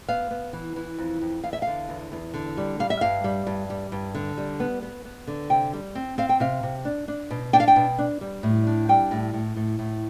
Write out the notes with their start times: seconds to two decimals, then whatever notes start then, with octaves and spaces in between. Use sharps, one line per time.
0.08 B3 F5
0.31 B3
0.53 E3
0.76 E3
0.98 F2
1.21 F2
1.44 E2 F5
1.53 E5
1.62 F5
1.67 D3
1.89 E2
2.12 E2
2.34 D3
2.57 G3
2.79 G3 F5
2.90 E5
3.01 G2 F5
3.24 G3
3.47 G2
3.70 G3
3.92 G2
4.14 D3
4.38 G3
4.60 B3
4.83 B3
5.05 B3
5.27 D3
5.50 C3 G5
5.73 G3
5.95 C4
6.18 C4 F5
6.29 G5
6.40 C3 F5
6.63 C3
6.85 D4
7.08 D4
7.31 B2
7.53 D4 G5
7.60 F5
7.68 G5
7.76 B2
7.98 D4
8.21 G3
8.43 A2
8.67 D4
8.89 G3 G5
9.11 A2
9.34 A2
9.56 A2
9.79 A2